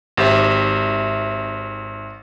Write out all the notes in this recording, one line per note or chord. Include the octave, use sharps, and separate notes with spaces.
G#1 G4 C5 E5